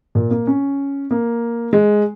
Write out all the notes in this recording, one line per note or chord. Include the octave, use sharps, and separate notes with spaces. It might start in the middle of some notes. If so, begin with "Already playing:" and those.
A#2
A#3
C#4
A#3
G#3